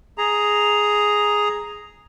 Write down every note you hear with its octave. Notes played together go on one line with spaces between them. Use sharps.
G#4 A#5